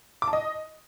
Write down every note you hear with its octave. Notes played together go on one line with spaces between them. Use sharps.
D6
A5
D#5